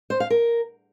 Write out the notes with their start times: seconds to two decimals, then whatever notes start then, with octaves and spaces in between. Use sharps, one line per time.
0.10 C5
0.20 F5
0.30 A#4